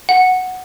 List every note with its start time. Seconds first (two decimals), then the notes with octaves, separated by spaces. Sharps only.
0.09 F#5